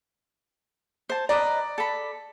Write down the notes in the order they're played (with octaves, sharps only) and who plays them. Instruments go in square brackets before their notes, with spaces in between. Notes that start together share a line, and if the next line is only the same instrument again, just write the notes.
[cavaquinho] C5 A5
[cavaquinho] B4 D#5 A#5 [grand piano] D5
[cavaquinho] A4 B5